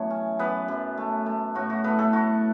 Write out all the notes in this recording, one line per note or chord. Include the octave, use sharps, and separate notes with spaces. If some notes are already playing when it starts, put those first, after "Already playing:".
Already playing: F#2 E3 A3 B3 C#5
C#4
F#2 B3 B4
F#2
A3
A3
A2 F#4
F#4
A3 B3 B4
A3 A4
A3 F#4